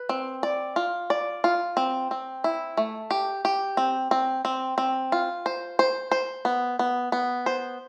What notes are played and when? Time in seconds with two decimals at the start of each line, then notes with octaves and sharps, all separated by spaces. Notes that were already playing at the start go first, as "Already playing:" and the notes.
Already playing: B4
0.09 C4
0.43 D5
0.76 F4
1.10 D5
1.44 F4
1.77 C4
2.11 C4
2.44 E4
2.77 A3
3.11 G4
3.45 G4
3.77 C4
4.11 C4
4.45 C4
4.78 C4
5.12 F4
5.46 C5
5.79 C5
6.11 C5
6.45 B3
6.79 B3
7.12 B3
7.46 C5